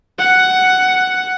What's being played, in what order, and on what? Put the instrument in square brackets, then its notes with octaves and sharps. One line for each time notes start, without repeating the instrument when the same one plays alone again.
[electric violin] F#5